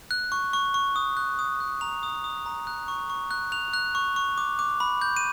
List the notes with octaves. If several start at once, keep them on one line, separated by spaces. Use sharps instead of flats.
F#6
C#6
C#6
C#6
D#6
F#6
D#6
F#6
A#5 F7
D#6
D#6
A#5
F#6
C#6
C#6
F#6
F#6 F7
F#6
C#6
C#6
D6
D6
B5
G6
D#7